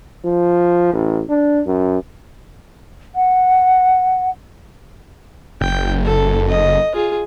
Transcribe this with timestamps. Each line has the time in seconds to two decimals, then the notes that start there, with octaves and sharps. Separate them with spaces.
0.25 F3
0.93 A1
1.29 D4
1.66 F#2
3.15 F#5
5.61 F#1 G5
6.05 A4
6.47 D#5
6.93 F4 G#4